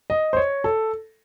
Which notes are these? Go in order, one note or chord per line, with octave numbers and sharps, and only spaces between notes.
D#5
C5
C#5
A4